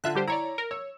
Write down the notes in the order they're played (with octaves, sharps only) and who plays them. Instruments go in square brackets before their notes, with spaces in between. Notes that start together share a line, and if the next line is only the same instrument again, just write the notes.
[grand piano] D3 [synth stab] F4 E5 F#6
[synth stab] G3 G4 C5
[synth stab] E4 C#5 D5 [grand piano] A#5
[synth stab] A#4
[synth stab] C#5 [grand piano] E6